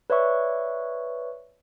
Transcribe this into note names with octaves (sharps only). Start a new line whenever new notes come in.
B4 C#5 D5 E5 C#6